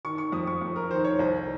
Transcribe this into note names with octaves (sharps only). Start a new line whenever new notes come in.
D#3 C#6
C#6
F2 D#6
C#6
F2
A#4
D#3 C5
C#5
C2 C5